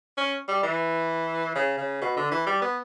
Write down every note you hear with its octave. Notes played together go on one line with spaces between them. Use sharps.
C#4
G3
E3
C#3
C#3
B2
D3
E3
G3
B3